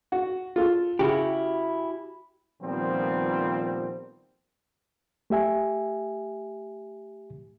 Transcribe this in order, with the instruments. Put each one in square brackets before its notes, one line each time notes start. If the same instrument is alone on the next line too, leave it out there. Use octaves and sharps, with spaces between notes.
[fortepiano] F#4
F4 A4
[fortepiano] C#3 [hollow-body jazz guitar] E4 F#4 G4
[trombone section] A#2 D#3 F3 G3 B3 C4
[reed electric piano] A3 G4 E5 G#5